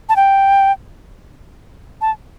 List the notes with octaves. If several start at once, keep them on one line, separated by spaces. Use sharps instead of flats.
A5
G5
A5